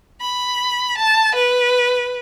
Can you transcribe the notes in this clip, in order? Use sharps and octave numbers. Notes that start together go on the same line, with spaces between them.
B5
A5
B4